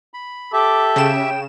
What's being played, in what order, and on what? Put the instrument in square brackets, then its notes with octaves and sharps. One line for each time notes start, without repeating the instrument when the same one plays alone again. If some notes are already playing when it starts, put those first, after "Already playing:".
[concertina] B5
[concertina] G4 E5 [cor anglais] A4 [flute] D6
[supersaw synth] C#3 E7 [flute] G5